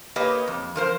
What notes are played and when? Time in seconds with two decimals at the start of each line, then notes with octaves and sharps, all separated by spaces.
0.16 A#3 G4 B4 C#5 D#5
0.48 F2
0.76 F3 A#4 C5